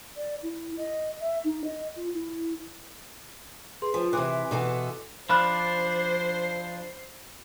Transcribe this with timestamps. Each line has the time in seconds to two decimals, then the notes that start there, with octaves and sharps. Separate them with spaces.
0.16 D5
0.42 E4
0.77 D#5
1.20 E5
1.44 D#4
1.64 D#5
1.96 F4
2.14 E4
3.82 G#4 B4 C6
3.94 F3
4.13 C3 E3 C6 D6 F#6
4.51 B2 E3 A4
5.29 F3 D4 C5 B5 F6 F#6